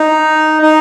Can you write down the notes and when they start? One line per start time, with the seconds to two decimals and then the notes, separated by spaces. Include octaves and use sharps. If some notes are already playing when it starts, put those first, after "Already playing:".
Already playing: D#4
0.63 D#4